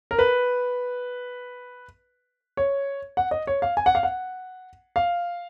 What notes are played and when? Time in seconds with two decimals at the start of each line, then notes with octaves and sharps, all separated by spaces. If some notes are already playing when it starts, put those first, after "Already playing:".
0.11 A#4
0.19 B4
2.57 C#5
3.17 F#5
3.31 D#5
3.47 C#5
3.62 F5
3.77 G#5
3.86 F#5
3.95 F5
4.03 F#5
4.96 F5